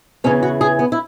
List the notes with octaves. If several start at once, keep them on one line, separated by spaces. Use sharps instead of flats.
E2 C#3 E3 C#4
F#4
G#4
B3
E4